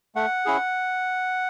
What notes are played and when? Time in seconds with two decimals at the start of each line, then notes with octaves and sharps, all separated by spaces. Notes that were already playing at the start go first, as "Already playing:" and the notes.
0.15 A3 F#5
0.46 C#4 E4 G#4